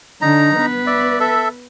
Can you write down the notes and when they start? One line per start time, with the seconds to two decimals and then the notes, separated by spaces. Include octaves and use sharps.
0.22 D3 D#4 A#5
0.56 B3 B4
0.87 D5 E5
1.20 A4 E5